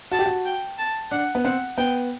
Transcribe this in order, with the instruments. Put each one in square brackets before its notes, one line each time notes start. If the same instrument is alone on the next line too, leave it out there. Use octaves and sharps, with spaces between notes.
[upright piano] F#4 [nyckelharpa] A5
[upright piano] G4
F#4
[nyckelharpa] G5
A5
[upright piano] D4 [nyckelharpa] F#5
[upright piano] B3
[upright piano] C4 [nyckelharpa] F#5
[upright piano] B3 [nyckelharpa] G5